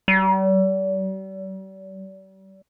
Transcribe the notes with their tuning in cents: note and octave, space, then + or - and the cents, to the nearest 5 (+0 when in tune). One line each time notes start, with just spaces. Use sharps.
G3 -40